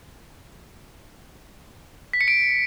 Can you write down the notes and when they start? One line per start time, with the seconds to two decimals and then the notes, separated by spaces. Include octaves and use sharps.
2.13 B6
2.21 C#7
2.28 D7